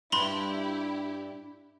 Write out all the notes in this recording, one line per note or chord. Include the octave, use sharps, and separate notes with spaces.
G2 D4 E4 G4 B5 C6 G7